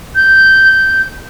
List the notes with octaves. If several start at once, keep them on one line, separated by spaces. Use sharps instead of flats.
G6